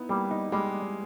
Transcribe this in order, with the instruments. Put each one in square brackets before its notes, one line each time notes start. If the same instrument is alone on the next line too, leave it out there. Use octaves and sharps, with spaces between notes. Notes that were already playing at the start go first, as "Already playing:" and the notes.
Already playing: [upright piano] B3 D#4 E4
[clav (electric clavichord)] G3 [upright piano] A#3
[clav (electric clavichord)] D#4
[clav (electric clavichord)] G3 [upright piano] G#3